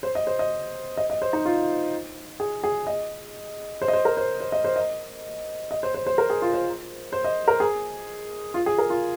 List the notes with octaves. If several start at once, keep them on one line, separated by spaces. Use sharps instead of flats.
C5
D#5
C5
D#5
D#5
D#5
C5
D#4
F4
G#4
G#4
D#5
C5
D#5
C5
A#4
C5
C5
D#5
C5
D#5
D#5
C5
C5
C5
A#4
G#4
F4
C5
C5
D#5
A#4
G#4
F4
G#4
A#4
F4